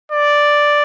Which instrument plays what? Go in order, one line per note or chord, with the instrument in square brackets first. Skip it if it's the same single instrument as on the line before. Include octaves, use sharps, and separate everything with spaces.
[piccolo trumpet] D5